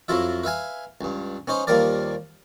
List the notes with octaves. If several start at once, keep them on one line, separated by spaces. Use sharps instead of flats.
F2 F#3 E4 F4 E5
B4 E5 F5 G#5
C#2 G2
B3 C#4 D#4 C5
D#2 F3 G3 A#3 A#4 D5